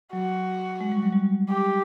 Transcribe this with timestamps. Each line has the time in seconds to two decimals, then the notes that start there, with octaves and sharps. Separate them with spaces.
0.13 F#3 F#4
0.81 G#3
0.92 G3
1.02 F#3
1.12 G3
1.49 G4